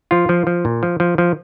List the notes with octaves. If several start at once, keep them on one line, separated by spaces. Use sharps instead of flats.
F3 F4
F3
F3
A#2
F3
F3
F3